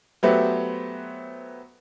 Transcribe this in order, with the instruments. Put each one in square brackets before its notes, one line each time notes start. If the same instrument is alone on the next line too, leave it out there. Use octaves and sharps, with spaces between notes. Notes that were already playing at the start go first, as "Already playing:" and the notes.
[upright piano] F#3 A3 B3 G4 B4 C5